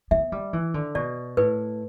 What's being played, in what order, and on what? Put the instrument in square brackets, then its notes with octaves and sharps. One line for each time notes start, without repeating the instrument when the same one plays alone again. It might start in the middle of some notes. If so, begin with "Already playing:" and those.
[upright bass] B3 [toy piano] E5
[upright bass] G3
E3
D3
[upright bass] B2 [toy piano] D5
[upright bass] A2 [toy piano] B4